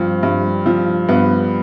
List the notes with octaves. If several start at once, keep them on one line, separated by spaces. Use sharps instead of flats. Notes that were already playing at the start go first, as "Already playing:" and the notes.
Already playing: G2 F3 C4
G2
F3
G2 B3